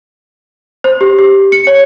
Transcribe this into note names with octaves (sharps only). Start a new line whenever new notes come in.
C5
G4
G4
C#7
C#5